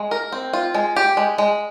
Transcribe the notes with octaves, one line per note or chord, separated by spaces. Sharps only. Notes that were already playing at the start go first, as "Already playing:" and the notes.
Already playing: G#3
A#4
C4
F4
G#3
G4
G#3
G#3